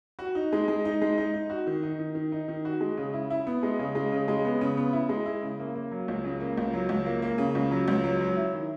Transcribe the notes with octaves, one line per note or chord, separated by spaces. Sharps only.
F#4
D#4
G#3
G#3
D#4
G#3
D#4
D#4
F#4
D#3
D#4
D#3
D#3
D#4
D#3
F#4
G#3
C#3
E4
E4
B3
G#3
C#3
G#3
C#3
G#3
B3
C#3
B3
E4
G#3
E4
C#3
A#3
A#3
F#3
C#2
C#3
A#3
C#2
F#3
C#2
A#3
A#3
C#3
C#2
F#3
C#2
F#3
F#3
E4
D#3